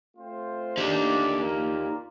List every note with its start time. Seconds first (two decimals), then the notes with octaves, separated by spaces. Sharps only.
0.16 A3 C4 F4 C5
0.77 A#2 A3 D4 D#4 G4
1.38 A#3 F4 A#4 D5